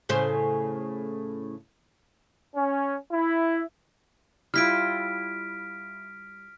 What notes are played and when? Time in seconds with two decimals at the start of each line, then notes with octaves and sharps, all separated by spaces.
0.09 A2 C#3 C5
2.55 C#4
3.12 E4
4.54 G3 E4 F4 F6 B6 D7